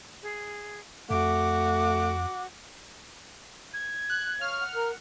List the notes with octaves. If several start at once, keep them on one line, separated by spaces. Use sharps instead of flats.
G#4
F2 A3 F#4 D6
G#6
F#6
C#5 F5 F6
F#5
A#4